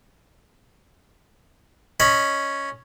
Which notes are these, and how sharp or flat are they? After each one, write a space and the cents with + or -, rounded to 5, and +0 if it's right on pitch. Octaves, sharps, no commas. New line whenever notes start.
C#4 +0 D#5 +0 B5 +0